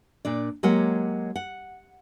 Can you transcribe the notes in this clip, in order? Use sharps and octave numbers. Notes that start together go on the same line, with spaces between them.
A#2 D4 D5
F#3 G#3 A#3 G4 C#5 F#5
F#5